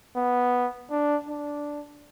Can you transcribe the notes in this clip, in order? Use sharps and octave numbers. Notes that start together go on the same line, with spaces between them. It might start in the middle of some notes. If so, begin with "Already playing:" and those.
B3
D4
D4